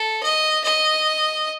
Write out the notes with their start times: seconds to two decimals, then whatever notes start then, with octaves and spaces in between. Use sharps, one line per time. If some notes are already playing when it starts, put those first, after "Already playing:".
Already playing: A4
0.23 D#5
0.64 D#5